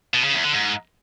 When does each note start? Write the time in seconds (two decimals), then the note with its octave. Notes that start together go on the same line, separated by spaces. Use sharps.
0.14 B2
0.24 C#3
0.34 E2
0.44 D3
0.54 G#2